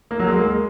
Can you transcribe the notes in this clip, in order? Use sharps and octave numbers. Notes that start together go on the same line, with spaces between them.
A#3
F#3
G#3
A#3
G#3